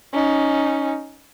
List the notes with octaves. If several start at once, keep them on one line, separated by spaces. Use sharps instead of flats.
C#4 D#4